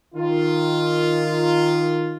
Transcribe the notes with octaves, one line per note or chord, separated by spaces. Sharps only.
D#3 F4